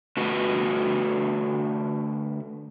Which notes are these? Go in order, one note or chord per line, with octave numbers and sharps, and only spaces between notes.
D3 A3 F#4 B4